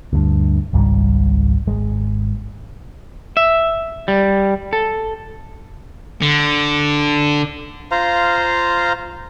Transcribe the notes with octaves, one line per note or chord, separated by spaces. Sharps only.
D2 G2
G#1 C#2 G#2 G3
G#1 G#3
E5
G3
A4
D3
F4 C5 F5 A#5